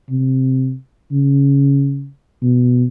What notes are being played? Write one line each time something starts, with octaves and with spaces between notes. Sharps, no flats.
C3
C#3
B2